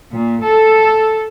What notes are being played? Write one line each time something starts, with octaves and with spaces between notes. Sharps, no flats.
A#2
A4